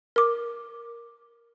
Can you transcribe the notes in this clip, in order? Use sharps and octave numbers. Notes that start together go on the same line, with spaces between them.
A#4 D6